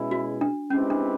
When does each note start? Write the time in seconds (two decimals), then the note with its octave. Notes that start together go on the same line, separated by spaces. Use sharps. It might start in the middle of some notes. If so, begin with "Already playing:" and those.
Already playing: B2 G#3 C#4 E4 G#4
0.11 F#4
0.41 D4
0.70 G#3 C4 C#4 E4 G4 B4
0.90 D4